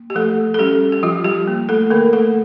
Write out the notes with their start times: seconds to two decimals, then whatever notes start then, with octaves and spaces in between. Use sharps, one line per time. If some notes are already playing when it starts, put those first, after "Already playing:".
Already playing: A#3
0.10 G4
0.15 F3 A3 A4
0.54 A4
0.59 G3 C#4 G4
0.92 G4
1.03 F3 G3 F4
1.24 G3 G4
1.47 A#3
1.69 A3 A4
1.91 D3 A#3 A#4
2.13 A3 A4